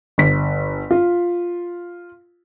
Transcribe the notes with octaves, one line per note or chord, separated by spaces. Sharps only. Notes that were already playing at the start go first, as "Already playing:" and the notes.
G1 B6
F4